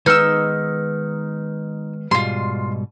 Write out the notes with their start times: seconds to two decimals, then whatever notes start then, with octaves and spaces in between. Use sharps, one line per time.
0.06 D#3 G#3 B3 D#4 B4 E6 F6
2.11 G#2 B2 G3 F4 C6